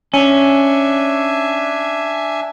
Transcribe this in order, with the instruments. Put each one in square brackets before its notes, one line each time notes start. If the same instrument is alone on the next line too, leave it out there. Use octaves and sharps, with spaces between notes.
[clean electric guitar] C#4 [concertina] D4 E5 G#5